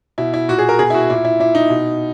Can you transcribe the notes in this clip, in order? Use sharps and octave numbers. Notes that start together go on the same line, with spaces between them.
B2 E4
E4
A#2 F#4
G#4
A#4
B2 G#4
E4
F#4
A#2 E4
E4
A#2 E4
D#4
B2